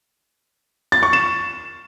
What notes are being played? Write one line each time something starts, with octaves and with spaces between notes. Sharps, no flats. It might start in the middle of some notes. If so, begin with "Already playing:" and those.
A6
C#6
E7